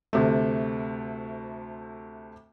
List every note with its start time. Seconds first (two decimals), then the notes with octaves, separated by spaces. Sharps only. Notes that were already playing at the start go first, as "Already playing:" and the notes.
0.13 D2 C3 A3